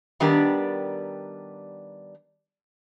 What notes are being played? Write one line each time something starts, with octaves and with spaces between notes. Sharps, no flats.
D#3 G3 B3 D4 G4 A#4